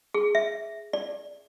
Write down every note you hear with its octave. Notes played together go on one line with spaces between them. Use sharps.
G#4
E5
D5